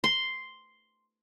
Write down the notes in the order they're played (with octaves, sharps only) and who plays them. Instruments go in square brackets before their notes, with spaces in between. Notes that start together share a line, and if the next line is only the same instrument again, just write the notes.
[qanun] C6